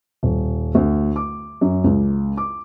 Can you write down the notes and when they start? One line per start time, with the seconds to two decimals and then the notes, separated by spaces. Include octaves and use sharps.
0.23 D#1
0.75 D2
1.16 D6
1.61 F#2
1.84 C#2
2.37 D6